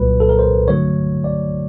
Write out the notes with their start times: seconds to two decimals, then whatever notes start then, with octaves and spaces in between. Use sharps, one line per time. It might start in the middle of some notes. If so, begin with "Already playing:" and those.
Already playing: C2 A#2 F#3 B4
0.20 A4
0.29 A#4
0.39 C5
0.68 G2 D3 F#3 A3 C#5
1.24 D5